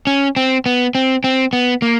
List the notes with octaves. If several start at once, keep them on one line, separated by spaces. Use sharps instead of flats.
C#4
C4
B3
C4
C4
B3
A#3